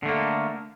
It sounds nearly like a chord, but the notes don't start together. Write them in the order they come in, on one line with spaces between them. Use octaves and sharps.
D3 A3 A#3